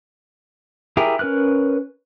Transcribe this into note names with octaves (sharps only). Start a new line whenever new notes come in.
E4 G4 G#4 A#4
C#4 A#4 B4 F6 F#6